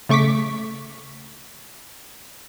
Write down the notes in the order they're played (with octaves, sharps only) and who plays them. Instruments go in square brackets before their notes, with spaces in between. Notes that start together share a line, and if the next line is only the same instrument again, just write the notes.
[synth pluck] C#3 A3 C#6 D6 B6